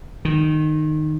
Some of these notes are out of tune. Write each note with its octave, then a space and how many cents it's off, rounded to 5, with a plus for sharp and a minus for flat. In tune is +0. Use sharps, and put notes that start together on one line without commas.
D#3 -15